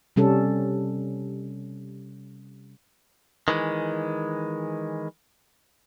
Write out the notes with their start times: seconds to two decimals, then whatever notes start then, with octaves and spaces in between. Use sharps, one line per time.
0.16 C3 G3 C#4 A4
3.48 D#3 E3 G#3